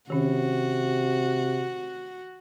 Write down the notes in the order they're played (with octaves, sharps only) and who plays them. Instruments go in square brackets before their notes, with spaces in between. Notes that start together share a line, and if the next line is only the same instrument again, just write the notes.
[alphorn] C3 [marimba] D#3 C#4 [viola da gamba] F#4